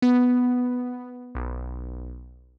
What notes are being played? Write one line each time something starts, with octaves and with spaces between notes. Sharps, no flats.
B3
B1